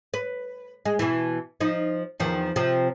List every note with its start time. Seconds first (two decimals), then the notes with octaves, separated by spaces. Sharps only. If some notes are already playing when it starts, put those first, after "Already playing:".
0.14 B4
0.85 G#3
0.99 B2 E3
1.61 F3 D#4
2.20 E2 D#3 F3
2.56 C3 F3